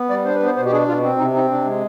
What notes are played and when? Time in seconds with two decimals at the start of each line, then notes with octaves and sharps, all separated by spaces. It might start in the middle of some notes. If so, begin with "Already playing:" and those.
Already playing: B3
0.09 G3 D5
0.25 D4 C5
0.35 B4
0.40 B3
0.46 C5
0.56 B2 C5
0.65 G4
0.72 D4 G#4
0.88 B2 F4
1.02 C4 D4
1.18 C3 D#4
1.34 C4 D#4
1.49 C3 D4
1.65 G#3